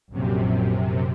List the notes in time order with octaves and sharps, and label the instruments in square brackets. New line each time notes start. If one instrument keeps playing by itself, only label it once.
[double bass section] A#1 [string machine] F#2 C3